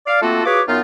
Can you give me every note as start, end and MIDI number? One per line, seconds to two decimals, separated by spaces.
0.07 0.19 74
0.07 0.19 77
0.22 0.41 57
0.22 0.41 58
0.22 0.41 60
0.22 0.41 65
0.22 0.41 66
0.22 0.41 69
0.45 0.61 65
0.45 0.61 66
0.45 0.61 68
0.45 0.61 71
0.45 0.61 73
0.45 0.61 86
0.68 0.81 42
0.68 0.81 59
0.68 0.81 63
0.68 0.81 65